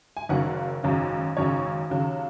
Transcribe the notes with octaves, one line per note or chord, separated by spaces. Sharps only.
G#5
F#1 F#2 D#3 A#3 C#4 F#5
G#1 F#2 C#3
G#1 F#2 C#3 C#5
D#2 C#3 F#3